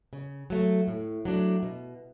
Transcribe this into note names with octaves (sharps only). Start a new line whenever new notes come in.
C#3
F#3 A3
A2
F#3 A3 D4
B2